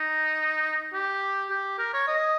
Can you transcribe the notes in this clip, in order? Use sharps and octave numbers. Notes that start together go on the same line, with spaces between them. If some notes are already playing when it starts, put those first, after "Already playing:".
Already playing: D#4
G4
G4
A#4
C#5
D#5